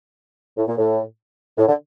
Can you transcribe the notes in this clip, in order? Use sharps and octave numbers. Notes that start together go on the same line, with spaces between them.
A2
A#2
A2
A2
D3